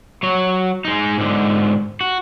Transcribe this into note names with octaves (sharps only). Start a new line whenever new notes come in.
F#3 C#5
G#3 D#4
G#2 D3
F#4